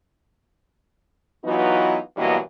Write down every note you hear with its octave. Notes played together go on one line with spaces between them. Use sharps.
E3 F#3 B3 D#4 F4 F#4
G2 B2 E3 F#3 A#3 D#5